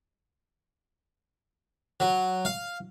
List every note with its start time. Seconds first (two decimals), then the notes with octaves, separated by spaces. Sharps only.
2.00 F#3
2.45 F5